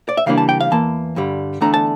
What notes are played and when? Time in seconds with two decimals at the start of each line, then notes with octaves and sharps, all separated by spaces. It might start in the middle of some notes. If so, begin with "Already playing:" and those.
0.09 D5
0.17 E5
0.26 C#3 E3 G3 A#3 D4 F5
0.38 A5
0.49 G5
0.61 F5
0.71 E2 E3 A#3 A5
1.16 G2 D3 G3
1.61 E2 D3 A3 D4 A#5
1.74 A5